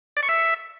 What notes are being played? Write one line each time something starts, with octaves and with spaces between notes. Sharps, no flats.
D5
C#6
E5